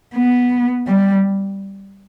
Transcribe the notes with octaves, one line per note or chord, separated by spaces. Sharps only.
B3
G3